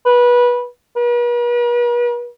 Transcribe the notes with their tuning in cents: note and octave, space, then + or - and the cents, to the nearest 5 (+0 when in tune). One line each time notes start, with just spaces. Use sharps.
B4 -20
B4 -45